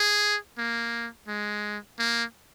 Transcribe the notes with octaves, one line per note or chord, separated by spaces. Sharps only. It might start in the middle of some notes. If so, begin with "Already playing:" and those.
Already playing: G#4
A#3
G#3
A#3